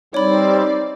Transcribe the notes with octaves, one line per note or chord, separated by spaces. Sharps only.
G3 C4 D#4 C#5 D5 B5